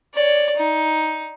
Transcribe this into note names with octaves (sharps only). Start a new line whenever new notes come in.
C#5 D5
D#4